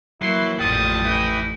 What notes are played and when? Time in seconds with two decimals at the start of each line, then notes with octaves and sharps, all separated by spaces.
0.22 E3 F#3 A#3 E4 C6
0.59 A1 F2 F3 G3 G5 A5 D#6
1.05 D#4 E4 B4